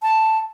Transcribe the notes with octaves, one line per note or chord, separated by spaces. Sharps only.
A5